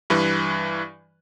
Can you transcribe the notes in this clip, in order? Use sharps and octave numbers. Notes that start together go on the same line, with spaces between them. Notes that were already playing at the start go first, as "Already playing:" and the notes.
G2 E3 B4